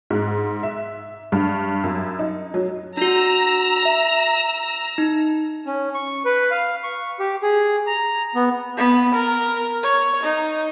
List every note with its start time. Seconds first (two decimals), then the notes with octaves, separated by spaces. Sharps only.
0.10 G#2
0.63 E5
1.32 G2
1.84 F#2
2.19 D#4
2.54 F#3
2.97 D4 F#4 A#5 E6
3.85 E5
4.98 D#4
5.66 C#4
5.95 C#6
6.25 B4
6.51 F5
6.83 C#6
7.20 G4
7.42 G#4
7.87 A#5
8.35 B3
8.77 B3
9.14 A#4
9.83 C#5
10.23 D#4